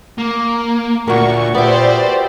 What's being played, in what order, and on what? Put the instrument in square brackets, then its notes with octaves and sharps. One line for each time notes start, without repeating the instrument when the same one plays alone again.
[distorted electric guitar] A#3
[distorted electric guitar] D2 [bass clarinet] A#2 [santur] F#4 A#4 [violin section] C#6
[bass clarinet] A#2 [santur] B3 E5 [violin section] G4 C5 [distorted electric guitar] D5